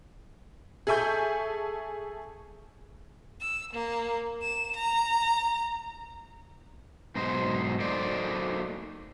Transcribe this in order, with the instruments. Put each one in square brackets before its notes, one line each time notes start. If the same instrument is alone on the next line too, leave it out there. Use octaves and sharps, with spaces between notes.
[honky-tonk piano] G#4 A4 E5 G#5 C#6 G6
[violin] E6
A#3
E7
A#5
[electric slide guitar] G#2 B2 F#3 D#4 C5
F#3 A3 A#3 D#4 C5 D5